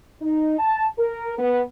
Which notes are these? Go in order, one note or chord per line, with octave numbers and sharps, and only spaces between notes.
D#4
A5
A#4
B3